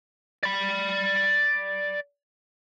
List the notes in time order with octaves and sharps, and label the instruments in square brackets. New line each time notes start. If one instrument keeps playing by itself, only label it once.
[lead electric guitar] D5 B5